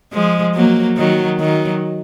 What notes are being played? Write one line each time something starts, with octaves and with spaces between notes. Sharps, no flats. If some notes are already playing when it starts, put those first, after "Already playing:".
F3 G#3
F#3 A#3
D#3 F#3
D#3 F#3